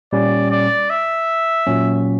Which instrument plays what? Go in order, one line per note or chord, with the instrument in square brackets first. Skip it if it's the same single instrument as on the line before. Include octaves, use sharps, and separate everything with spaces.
[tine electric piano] A#2 G3 C#4 [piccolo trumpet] D5
[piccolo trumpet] D5
E5
[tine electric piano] A#2 F#3 C#4